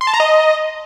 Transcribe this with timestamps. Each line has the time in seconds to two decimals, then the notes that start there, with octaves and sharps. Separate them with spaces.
0.01 C6
0.07 A5
0.14 A#5
0.20 D#5